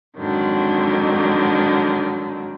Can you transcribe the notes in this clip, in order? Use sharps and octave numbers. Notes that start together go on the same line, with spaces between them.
F2 G#2 D3 D#3 F#3